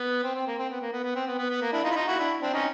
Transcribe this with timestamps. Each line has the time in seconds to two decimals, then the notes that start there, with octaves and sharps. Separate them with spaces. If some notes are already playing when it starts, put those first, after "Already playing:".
Already playing: B3
0.24 C4
0.35 C4
0.47 A#3
0.59 C4
0.69 B3
0.81 A#3
0.92 B3
1.04 B3
1.15 C4
1.27 B3
1.38 B3
1.50 B3
1.61 A#3
1.73 D4 E4
1.84 D#4 F4
1.91 E4
1.96 D#4 F4
2.07 E4 F#4
2.19 D4 E4
2.42 C4 D4
2.54 C#4 D#4